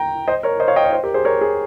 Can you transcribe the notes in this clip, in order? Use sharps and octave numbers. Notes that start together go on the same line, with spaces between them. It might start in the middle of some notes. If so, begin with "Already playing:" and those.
Already playing: G5 A#5
C5 D#5
A#4 C#5
C5 D#5
C#5 F5
D#5 G5
C#5 F5
C5 D#5
G4 A#4
G#4 C5
A#4 C#5
G#4